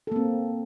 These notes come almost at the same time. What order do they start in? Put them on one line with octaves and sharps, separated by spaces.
A4 A#3 C4